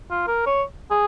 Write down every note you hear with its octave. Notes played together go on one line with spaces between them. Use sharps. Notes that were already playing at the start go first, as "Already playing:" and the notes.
F4
A#4
C#5
G#4